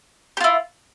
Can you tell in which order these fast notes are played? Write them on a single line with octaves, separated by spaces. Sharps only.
G4 F4 E4